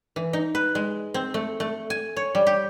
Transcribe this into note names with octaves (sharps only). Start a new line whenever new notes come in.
E3
D#4
B4
G#3
C4
A3
A3
G#5
C#5
G3
G4